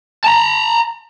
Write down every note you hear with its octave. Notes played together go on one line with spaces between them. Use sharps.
A5 A#5